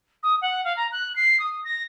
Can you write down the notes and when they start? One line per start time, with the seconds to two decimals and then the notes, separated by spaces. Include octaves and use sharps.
0.23 D#6
0.42 F#5
0.64 F5
0.77 A#5
0.92 F#6
1.16 C7
1.40 D#6
1.64 A#6